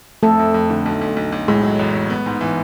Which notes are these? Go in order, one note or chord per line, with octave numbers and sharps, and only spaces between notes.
F2 A3 A4
F2
F2
D3
B1
B1
B1
B1
A2 G#3 G#4
F#3
A1
A1
B3
G#2
E3